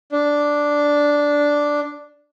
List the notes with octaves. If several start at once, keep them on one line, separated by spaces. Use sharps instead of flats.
D4